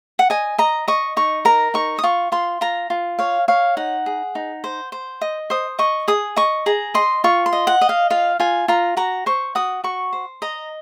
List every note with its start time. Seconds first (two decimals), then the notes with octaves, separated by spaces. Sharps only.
0.19 F#5
0.30 D#5 G#5
0.58 D#5 A#5
0.88 D#5 C#6
1.17 D#4 C#6
1.45 A#4 A#5
1.74 D#4 C#6
1.99 D#6
2.03 F4 C#6
2.32 F4 C6
2.61 F4 A#5
2.90 F4
3.19 C#5 F5
3.48 C#5 F5
3.77 D#4 F#5
4.06 G#4
4.35 D#4
4.64 C5
4.92 C5
5.21 D#5
5.50 C5 D#6
5.79 D#5 C#6
6.08 G#4 D#6
6.36 D#5 C#6
6.66 G#4 A#5
6.94 D#5 C6
7.24 F4 C#6
7.46 C6
7.53 D#5
7.67 F#5
7.81 D#5
7.89 F5
8.10 F4 F5
8.40 F4 G#5
8.68 F4 A#5
8.97 F#4 A#5
9.26 C5 C#6
9.55 F#4 D#6
9.84 F#4 C#6
10.13 C5
10.42 D#5 A#5